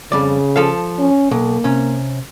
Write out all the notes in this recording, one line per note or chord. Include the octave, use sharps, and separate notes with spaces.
F2 C#3 G3 D5
F3 A4 F5
C#4
B1 A#3
C3 C#4